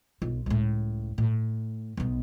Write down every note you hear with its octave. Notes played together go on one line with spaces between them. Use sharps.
B1 F4
C#2 A2
A2
B1 B3